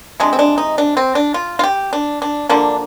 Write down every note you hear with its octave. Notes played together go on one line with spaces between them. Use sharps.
C3 F3 G#3 D4
C4
D4
D#4
D4
C4
D4
F4
F4
G4
D4
D4
D3 F3 A#3 D4